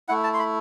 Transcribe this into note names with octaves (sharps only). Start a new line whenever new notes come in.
A3 E4 F#5
A5
C6
B5